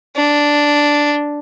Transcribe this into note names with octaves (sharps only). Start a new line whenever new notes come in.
D4